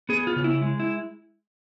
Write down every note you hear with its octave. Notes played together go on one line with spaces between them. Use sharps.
B3 G#4
F4
C#3
E4
G#3
E4